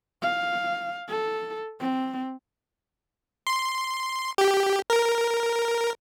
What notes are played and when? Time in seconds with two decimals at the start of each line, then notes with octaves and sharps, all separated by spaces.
0.22 F5
1.08 A4
1.80 C4
3.47 C6
4.38 G4
4.90 A#4